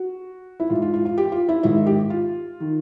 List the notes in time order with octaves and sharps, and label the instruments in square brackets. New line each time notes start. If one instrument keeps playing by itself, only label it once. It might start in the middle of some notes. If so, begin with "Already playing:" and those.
Already playing: [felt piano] F#4
E4
G#2 E3 F4
F4
F4
F4
G4
F4
E4
G#2 D#3 E4
G4
F4
D#3